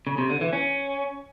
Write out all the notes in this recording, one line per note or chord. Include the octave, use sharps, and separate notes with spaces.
C#3
C3
D3
E3
C#4